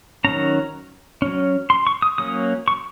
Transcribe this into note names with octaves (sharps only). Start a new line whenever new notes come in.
D#3 F#3 C#4 A#5
F#3 C#4
C6
C#6
D#6
F#3 A#3 C#4 D#6
C#6